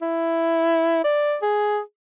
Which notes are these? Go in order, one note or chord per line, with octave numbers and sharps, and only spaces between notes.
E4
D5
G#4